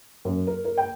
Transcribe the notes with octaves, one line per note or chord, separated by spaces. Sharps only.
F#2
A#4
A#4
G5